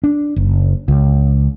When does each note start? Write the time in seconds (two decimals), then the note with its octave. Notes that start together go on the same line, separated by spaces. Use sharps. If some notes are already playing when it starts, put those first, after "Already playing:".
0.04 D4
0.36 F#1
0.88 C#2